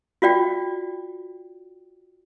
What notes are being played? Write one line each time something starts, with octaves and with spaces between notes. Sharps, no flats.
F4 F#4 D5 G5